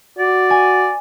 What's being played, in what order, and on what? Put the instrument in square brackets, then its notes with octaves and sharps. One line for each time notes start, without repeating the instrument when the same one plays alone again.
[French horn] F#4 [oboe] D5
[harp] G#5